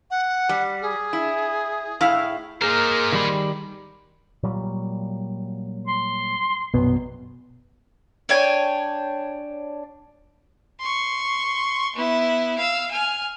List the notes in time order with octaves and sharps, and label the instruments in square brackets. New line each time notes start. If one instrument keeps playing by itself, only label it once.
[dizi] F#5
[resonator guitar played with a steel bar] G3
[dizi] G#4
[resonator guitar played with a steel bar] E4
A2 E4 F5
[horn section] A#3 G#4 [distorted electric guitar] D#4 C5 [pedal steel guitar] A#4
[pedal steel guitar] D#3 G3 B5
[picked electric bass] A#2 F#3 G3
[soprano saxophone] C6
[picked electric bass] A#1 F#2 F#3 [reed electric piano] B2 B3
[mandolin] D4 C#5 G5 G#5
[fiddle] C6 C#6
B3 E4
F5 E6
G#5 F6